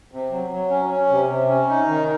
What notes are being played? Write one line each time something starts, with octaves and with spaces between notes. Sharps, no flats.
C3
F#3
F#3
C#4
C#4
C3
C3
C#4
D#4
D#3